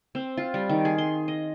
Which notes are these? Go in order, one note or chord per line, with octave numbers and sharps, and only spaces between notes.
C4
F4
G3
D#3
G#4
C6
D#5